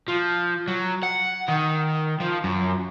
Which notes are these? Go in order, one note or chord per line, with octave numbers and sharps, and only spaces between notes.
F3
F#3
F#5
D#3
F3
F#2